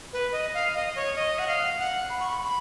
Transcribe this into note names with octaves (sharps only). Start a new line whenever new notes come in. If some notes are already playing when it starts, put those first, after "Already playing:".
B4
D#5
F5
D#5
C#5
D#5
F#5
F5
F#5
B5
C#6
B5
B5